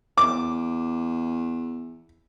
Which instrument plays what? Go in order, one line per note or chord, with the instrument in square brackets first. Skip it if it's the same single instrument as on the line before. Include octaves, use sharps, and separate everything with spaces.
[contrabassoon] E2 [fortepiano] D6